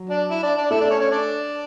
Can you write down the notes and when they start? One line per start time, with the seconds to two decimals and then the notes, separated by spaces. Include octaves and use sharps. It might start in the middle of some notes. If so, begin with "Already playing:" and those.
Already playing: F#3
0.10 D4 D5
0.30 E4 E5
0.43 D4 D5
0.57 D4 D5
0.71 A3 E4 A4 E5
0.80 D4 D5
0.90 C#4 C#5
1.01 C#4 C#5
1.11 D4 D5